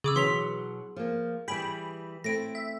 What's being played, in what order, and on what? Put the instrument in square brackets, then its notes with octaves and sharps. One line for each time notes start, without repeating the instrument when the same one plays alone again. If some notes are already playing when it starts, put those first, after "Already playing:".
[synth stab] C#3 [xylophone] G#4 D6 E6
[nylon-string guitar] B2 F#3 [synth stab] E3 [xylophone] C6 B6 F7
[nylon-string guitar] F3 A#3
[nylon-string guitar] E3 G3 G#4 [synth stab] G5 B5
[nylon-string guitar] A3 C4 E4 [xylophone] A#6 D7
[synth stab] E5